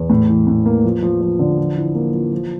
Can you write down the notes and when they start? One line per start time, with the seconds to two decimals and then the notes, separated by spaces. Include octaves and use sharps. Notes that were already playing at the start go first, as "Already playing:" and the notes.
Already playing: E2
0.10 A2
0.29 E3
0.47 A2
0.66 A#3
0.84 F3
1.02 F3
1.21 F3
1.39 D3
1.58 F3
1.77 E4
1.95 A#3
2.14 F3
2.32 F3